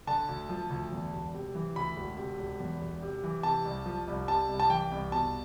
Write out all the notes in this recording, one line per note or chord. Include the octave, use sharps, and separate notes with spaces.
D3 A5
D2
F3
D2
E2
E1
C3
E3
D2 B5
E1
C3
E1
E2
E1
C3
E3
C3 A5
C2
F3
C2
C3 A5
C2
A5
E3 G5
C2
B2 A5